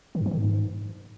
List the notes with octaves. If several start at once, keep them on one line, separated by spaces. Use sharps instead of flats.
D#3
G2
E3
D#3
G#2